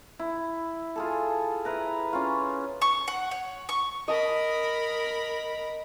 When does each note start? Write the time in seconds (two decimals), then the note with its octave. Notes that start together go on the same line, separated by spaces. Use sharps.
0.19 E4
0.96 F4 G#4 A4
1.65 E4 B4 A#5
2.13 C#4 F4
2.82 C#6
3.08 F#5
3.31 C#5
3.69 C#6
4.08 A#4 D#5 A5 B5